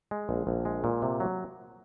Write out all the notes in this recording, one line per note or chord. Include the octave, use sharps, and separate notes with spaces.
G#3
A#1
A#1
G#3
A#2
C3
F#3